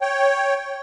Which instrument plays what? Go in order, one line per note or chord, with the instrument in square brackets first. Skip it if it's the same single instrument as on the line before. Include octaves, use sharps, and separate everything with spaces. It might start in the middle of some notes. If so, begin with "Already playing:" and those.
[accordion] C#5 G5